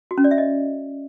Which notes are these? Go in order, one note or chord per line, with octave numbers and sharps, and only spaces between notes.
F#4
C#4
D5
E5
D#5